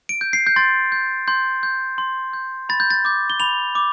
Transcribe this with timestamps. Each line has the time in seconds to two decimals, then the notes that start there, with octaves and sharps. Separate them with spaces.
0.09 D7
0.21 G6
0.33 C7
0.47 G6
0.56 C6 A6
0.92 G6
1.28 C6 G6
1.63 G6
1.98 C6
2.33 G6
2.69 B5 A6
2.80 G6
2.90 A6
3.05 D6 G6
3.30 G7
3.40 B5 F7
3.75 D6